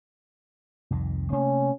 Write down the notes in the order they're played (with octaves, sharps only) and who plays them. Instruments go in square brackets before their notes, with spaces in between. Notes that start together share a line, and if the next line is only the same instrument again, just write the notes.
[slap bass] C2 F2 D#3
[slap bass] C3 A3 A#3 [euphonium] C#4